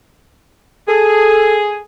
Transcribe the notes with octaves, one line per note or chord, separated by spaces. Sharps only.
G#4 A4